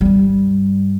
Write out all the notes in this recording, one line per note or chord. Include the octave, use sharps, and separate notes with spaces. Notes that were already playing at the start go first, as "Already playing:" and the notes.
G2 G3